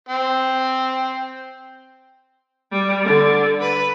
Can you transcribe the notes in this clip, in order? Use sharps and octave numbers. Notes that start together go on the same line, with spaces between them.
C4
G3
D3
B4